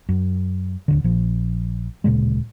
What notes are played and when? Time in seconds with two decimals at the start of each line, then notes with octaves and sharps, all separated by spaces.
0.09 F#2
0.88 D1 C#2 D3
1.04 A#1 A#2 F3
2.04 D1 A#2 C#3 G#3